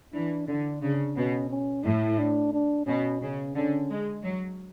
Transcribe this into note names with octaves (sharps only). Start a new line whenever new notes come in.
E3 D4
D3 D4
C#3 D4
B2 C#4
C#4
A2 E4
D4
D4
B2 C#4
C#3 C#4
D3 C#4
G#3
F#3